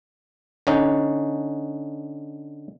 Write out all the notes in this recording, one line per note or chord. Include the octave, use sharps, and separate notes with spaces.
D3 C#4 D#4